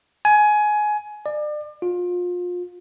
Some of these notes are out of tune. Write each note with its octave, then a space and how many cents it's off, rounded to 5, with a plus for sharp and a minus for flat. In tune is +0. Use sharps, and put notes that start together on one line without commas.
G#5 +20
D5 +35
F4 +30